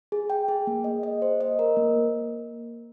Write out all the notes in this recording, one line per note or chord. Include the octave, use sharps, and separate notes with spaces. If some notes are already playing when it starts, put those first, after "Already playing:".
G#4
G5
G#4
A#3
D#5
D#5
C5
D#5
A#4
A#3